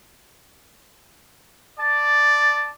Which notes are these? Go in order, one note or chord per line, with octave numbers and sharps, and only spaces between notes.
D5 A5